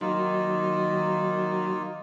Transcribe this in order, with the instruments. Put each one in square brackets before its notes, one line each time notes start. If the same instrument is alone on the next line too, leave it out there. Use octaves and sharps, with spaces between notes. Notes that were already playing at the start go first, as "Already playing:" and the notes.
[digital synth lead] D#3 [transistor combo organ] F#3 [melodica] A#3 D#4 F4